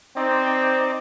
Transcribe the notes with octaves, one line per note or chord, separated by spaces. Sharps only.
C4 D#4 D5